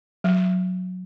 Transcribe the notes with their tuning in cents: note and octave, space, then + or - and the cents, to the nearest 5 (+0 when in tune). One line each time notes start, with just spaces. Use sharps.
F#3 -10